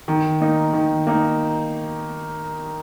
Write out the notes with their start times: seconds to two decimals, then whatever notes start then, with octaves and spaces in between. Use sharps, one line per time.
0.08 D#3
0.41 A#3 D#4
0.73 D#3
1.07 A#3 D#4